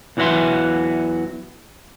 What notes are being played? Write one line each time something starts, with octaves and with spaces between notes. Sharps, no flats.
E2 E3 F#3 F#4 E5 C6